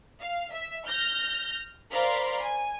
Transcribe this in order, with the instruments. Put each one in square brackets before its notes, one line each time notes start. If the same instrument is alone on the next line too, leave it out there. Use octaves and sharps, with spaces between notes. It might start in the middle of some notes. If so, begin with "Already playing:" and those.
[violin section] F5
E5
F6 G6 A#6
A#4 C5 D5 F5 B5 C6
G#5